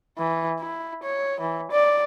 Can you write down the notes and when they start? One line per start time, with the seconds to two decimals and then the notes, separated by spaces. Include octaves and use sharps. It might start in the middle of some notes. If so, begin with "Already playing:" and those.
0.18 E3
0.59 E4
1.03 C#5
1.40 E3
1.72 D5